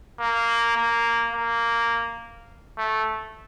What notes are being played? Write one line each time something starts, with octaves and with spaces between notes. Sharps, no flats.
A#3
A#3
A#3
A3